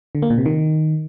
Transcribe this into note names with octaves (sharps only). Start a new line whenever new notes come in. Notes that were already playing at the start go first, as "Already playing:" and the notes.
D3
A#3
A#2
C3
D#3